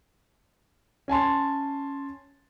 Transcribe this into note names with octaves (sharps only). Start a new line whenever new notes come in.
C#4 G#5 A5 C6